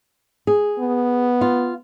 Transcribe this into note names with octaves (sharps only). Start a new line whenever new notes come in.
G#4
B3
F4